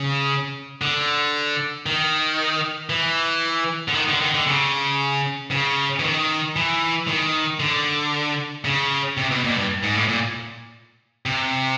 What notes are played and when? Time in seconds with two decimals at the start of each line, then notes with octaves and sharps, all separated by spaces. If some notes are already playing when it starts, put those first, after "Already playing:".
Already playing: C#3
0.82 D3
1.86 D#3
2.90 E3
3.88 D3
3.94 D#3
4.08 D3
4.21 D#3
4.34 D3
4.47 C#3
5.51 C#3
5.99 E3
6.03 D#3
6.56 E3
7.08 D#3
7.60 D3
8.65 C#3
9.17 C3
9.31 B2
9.44 A#2
9.56 G2
9.83 G#2
9.95 A2
10.09 A#2
11.26 C3